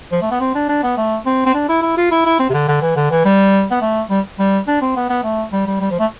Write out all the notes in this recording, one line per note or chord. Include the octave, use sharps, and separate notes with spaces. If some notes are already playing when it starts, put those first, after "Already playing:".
F3
A3
B3
C4
D4
D4
B3
A3
C4
C4
D4
E4
E4
F4
E4
E4
C4
C3
D3
D3
E3
D3
E3
G3
B3
A3
G3
G3
D4
C4
B3
B3
A3
G3
G3
G3
F3
A3